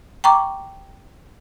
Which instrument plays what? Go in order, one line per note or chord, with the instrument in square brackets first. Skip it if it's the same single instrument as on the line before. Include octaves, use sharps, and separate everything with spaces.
[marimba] G5 A#5 C#6 D6